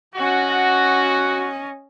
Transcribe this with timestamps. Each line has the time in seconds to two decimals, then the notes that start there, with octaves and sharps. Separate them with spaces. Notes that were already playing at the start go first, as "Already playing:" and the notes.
0.16 C#4 F#4 D#5